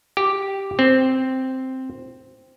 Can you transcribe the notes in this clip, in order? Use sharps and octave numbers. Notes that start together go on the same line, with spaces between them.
G4
C4